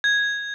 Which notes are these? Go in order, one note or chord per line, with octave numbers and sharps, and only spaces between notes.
G#6